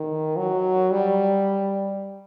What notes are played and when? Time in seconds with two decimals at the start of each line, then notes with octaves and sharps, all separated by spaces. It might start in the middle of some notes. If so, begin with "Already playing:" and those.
Already playing: D#3
0.37 F#3
0.91 G3